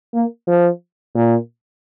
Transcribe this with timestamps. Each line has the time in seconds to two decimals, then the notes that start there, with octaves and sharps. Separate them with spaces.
0.14 A#3
0.47 F3
1.15 A#2